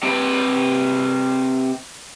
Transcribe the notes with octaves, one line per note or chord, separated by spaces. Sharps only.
C3 B4